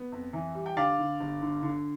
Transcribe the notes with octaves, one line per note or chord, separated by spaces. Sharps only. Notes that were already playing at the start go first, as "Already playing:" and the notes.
Already playing: B3
F2
E3
G3
G5
D3 D5 F5
D3
G1
D3
D3